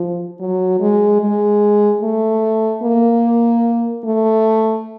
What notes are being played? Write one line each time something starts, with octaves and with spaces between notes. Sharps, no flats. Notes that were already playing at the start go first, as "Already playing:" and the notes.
Already playing: F3
F#3
G#3
G#3
A3
A#3
A3